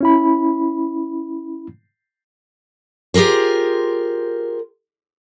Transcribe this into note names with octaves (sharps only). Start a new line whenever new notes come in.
C#4 E4 B5
F4 G4 G#4 A#4 C5